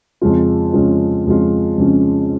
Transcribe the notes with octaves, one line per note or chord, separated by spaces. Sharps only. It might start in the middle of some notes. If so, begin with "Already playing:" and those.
F2 C#3 G#3 C#4 F4
F2 C#3 G#3 C#4 F4
F2 C#3 G#3 C#4 F4
F2 C#3 G#3 C#4 F4